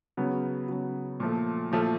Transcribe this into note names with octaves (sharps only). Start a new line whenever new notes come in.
C#3 F#3 B3
C#3 F#3 B3
A#2 F3 A3
A#2 F3 A3